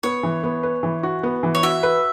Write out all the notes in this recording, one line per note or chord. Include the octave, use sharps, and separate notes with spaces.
B3 C#5
E3
B3
B4
E3
F#4
B3
E3
C#5
F#4 E5
B4